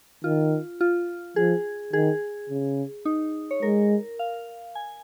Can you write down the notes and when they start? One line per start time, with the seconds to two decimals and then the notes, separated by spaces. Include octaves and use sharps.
0.24 D#3 F4
0.81 F4
1.36 F3 G#4
1.93 D#3 G#4
2.49 C#3
3.05 D#4
3.51 C#5
3.62 G#3 A#4
4.19 F5
4.75 G#5